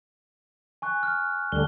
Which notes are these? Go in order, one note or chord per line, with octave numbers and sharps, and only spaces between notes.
G#5 C#6 F#6
F6
D2 D3 G3 G7